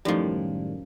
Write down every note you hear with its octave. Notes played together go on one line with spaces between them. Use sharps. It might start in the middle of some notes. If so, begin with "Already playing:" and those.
F#2 A2 D#3 F3 G3